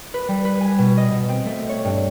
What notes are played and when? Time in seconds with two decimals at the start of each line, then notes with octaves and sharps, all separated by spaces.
0.14 B4
0.28 G3
0.45 B4
0.61 G#5
0.78 B2
0.98 D#5
1.12 B2
1.29 C4
1.46 A3
1.69 C#5
1.85 G2